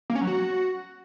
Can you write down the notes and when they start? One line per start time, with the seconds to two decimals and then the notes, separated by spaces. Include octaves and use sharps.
0.10 A#3
0.15 C#4
0.21 F#3
0.27 F#4